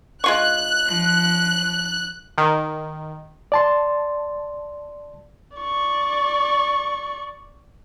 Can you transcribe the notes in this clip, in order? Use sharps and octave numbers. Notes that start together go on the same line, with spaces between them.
G#3 F4 C#6 F#6
F3
D#3
D5 A5 C6
D5 C#6